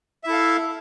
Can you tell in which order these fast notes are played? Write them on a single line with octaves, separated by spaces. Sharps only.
E5 E4 A4 F5